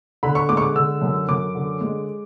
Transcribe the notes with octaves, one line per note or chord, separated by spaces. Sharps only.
D3 B5
C#6
G#3 D6
C#6
D6
D3 E6
F#2
F#2 D6
D3
G#3